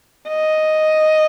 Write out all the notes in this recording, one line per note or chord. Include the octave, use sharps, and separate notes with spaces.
D#5